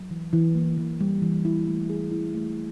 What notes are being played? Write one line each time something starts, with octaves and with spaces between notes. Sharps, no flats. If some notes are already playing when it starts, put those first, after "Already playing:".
Already playing: F#3
E3
E3
A#3
E3
G3
E3
E4
A3
G#4
E4
A3